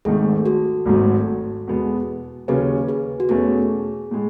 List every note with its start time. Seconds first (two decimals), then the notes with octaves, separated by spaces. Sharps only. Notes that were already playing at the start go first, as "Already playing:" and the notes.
0.05 G#1 G#2 D#3 A3 G#4
0.46 F#4 A4
0.86 G#1 G#2 F#3 A3
1.67 E2 B2 G#3 B3
2.48 D#2 C#3 F#3 C#4 G#4 B4
2.88 G#4 B4
3.20 F#4
3.29 E2 B2 A3 C#4 G#4
4.11 A2 G#3